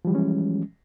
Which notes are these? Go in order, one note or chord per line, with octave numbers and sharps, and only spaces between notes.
E3 F3 G3 G#3 C#4